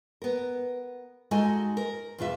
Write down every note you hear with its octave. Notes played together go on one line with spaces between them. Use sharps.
B3 A#4
G#3 D#4 F#4 A4 D#5 G#5
A#4
E2 B2 F4 E5